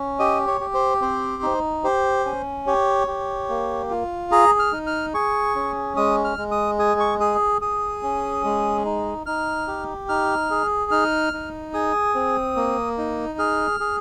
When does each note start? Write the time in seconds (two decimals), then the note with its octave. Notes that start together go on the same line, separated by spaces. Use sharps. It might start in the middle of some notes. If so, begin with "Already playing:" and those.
Already playing: C#4
0.19 G4 D#5
0.47 C#5
0.61 G4
0.74 C5
1.02 C4 C5
1.43 D#4
1.84 G4 C5
2.25 C#4
2.67 G4 C#5
3.07 G4
3.49 A#3
3.90 F4
4.32 G#4 A#5
4.59 F6
4.73 D#4
4.87 F6
5.14 G#4 C#6
5.56 C#4
5.97 G#3 D#6
6.24 F6
6.38 G#3
6.52 D#6
6.79 G#4 D#6
7.00 C#6
7.20 G#4 D#6
7.62 G#4 D#6
8.03 C#4
8.44 G#3
8.85 D#4
9.26 D#4 F6
9.68 G4
10.09 D#4 F6
10.50 G#4
10.91 D#4 F6
11.33 D#4
11.74 G#4 D#6
12.15 C4
12.56 A#3
12.98 D#4
13.39 G#4 F6
13.80 G#4